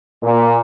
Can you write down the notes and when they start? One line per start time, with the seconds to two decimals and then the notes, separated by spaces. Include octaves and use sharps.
0.22 A#2